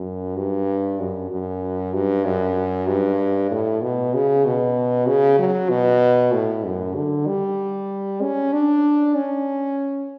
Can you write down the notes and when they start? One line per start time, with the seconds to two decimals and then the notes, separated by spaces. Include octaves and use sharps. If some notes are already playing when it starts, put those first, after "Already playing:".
Already playing: F#2
0.37 G2
1.00 F#2
1.31 F#2
1.93 G2
2.25 F#2
2.88 G2
3.51 A2
3.83 B2
4.14 C#3
4.45 B2
5.07 C#3
5.39 F#3
5.70 B2
6.33 A2
6.64 F#2
6.96 D3
7.27 G3
8.22 C#4
8.53 D4
9.15 C#4